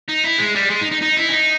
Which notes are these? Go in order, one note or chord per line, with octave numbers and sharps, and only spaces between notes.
D#4
E4
G#3
G3
G#3
D#4
D#4
D#4
E4
C#4
D#4